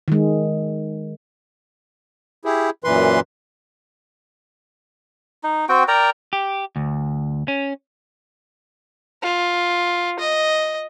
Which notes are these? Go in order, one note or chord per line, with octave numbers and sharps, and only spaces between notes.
D#3 G#3
E4 G4 G#4
F#2 A#2 E3 B4 C6
D#4
C4 F#4 G5
A#4 D5 G5 A#5
G4
D2
C#4
F4
D#5